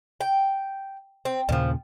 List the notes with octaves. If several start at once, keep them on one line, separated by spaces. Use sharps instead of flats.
G5
C4
D#2 A#2 C#3 F3 G3